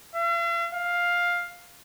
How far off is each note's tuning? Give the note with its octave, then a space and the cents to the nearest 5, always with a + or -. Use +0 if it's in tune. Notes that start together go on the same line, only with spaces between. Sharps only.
F5 -45
F5 +10